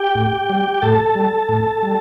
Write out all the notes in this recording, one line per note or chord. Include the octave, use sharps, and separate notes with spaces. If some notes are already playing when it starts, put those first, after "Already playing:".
Already playing: G4 G5
A2
G3
G5
A2 A4 A5
G3
A2
G3